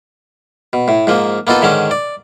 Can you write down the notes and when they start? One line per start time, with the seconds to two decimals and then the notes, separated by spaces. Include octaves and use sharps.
0.73 B2
0.88 A2
1.07 G#2 F3 A#3
1.47 A#3 B3 D#4 F4 A4
1.62 G#2 D3 D#3 C#4
1.91 D5